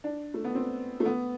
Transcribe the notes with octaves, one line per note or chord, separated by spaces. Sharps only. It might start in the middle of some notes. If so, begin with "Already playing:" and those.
D4
A3
B3
C4
A3
B3